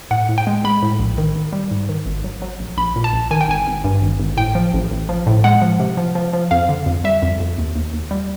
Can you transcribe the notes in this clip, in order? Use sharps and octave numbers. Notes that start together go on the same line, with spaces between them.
A2 F#5
A2
G5
G#3
G#3 B5
A2
A#1
D#3
D#3
G3
G#2
D#3
G#1
F#3
F#3
A#1
A#1 B5
A#2
A5
A#1
D#3 G#5
G5
G#1 G#5
G#1
G2
G#1
G#1
A2 G5
F3
A1
A1
F3
A2
G#3 F#5
F3
C3
F3
F3
F3
F2 F5
D3
F2
G3 E5
F2
F2
D#2
D#2
D#2
G3